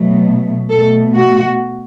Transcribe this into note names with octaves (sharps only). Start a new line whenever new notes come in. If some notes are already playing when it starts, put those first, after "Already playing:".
Already playing: B2 F#3 A3
B2 A3 A4
F#4